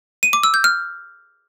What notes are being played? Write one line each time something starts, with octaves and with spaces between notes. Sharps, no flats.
D#7
D6
E6
G6
F6